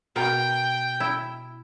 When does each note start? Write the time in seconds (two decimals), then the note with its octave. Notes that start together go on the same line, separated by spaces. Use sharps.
0.16 B2 A#4 G5
1.00 E4